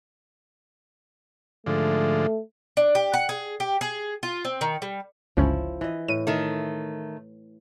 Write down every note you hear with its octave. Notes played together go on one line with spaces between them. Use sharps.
G#2 D3 F3 A3
D4
G4
F#5
G#4
G4
G#4
F4
C4
D#3
G3
G1 C#2 F3 C#4 E4
E3 D#5
A2 D#7
D#3 A3